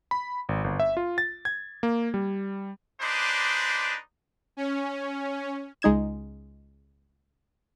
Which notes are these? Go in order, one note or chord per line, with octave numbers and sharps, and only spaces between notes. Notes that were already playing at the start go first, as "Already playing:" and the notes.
B5
G#1
G1
E5
F4
A6
G#6
A#3
G3
G#3 D4 D#4 B4 C5 D5
C#4
C#2 G#3 D#4 G#6 E7